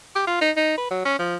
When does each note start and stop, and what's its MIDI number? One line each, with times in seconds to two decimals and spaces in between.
0.16 0.23 67
0.27 0.37 65
0.41 0.51 63
0.56 0.77 63
0.78 0.86 71
0.91 1.04 54
1.05 1.17 61
1.19 1.36 53